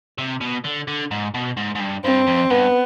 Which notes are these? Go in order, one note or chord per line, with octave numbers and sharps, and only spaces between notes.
C3
B2
D3
D3
G#2
B2
G#2
G#2
G2
G2 C4
F2
G2 B3